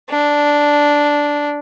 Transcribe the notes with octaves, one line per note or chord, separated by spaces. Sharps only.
D4